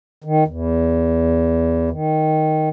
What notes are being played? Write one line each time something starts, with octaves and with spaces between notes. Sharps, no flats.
D#3
E2
D#3